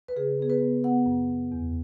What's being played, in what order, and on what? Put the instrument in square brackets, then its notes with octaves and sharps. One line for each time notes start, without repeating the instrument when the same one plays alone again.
[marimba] B4
C#3 G#4
B3 G#4
B4
B3
B3 F#5
F#2
F#2
E2